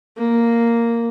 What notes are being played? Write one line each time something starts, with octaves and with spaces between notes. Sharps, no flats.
A#3